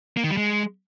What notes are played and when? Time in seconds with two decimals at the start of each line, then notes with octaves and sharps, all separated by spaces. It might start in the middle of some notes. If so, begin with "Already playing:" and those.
0.17 A#3
0.24 D#3
0.31 G3
0.37 G#3